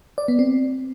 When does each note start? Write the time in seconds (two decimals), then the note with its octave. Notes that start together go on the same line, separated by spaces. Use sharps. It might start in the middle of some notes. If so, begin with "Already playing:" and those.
0.18 D5
0.28 B3
0.39 C4